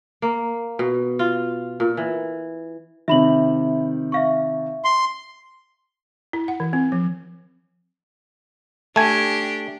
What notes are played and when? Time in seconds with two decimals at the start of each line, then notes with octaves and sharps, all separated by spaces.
0.22 A#3
0.79 B2
1.19 F4
1.80 A#2
1.97 E3
3.08 C3 D#3 E5 B5 F#7
4.12 E5 F5 C#6
4.84 C6
6.33 E4
6.48 F#5
6.60 E3
6.73 C4
6.92 F3
8.96 A3 D4 G4 G#5